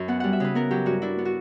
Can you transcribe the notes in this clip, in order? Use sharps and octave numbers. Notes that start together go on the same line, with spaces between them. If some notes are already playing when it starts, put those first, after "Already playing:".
Already playing: F#2
B3 F#5
G3 F#5
E5
C#3 B4
B3 A#4
F#3 G4
G2 F#4
D4 E4
B3
F#4